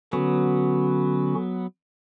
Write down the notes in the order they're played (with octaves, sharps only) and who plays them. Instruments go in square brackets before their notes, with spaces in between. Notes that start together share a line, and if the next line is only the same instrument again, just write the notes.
[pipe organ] D3 C#4 F#4 [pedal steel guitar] F#3 B3